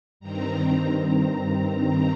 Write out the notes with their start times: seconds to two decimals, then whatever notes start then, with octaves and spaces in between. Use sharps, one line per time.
0.20 G2 D#3 C4 A#5
1.11 A#5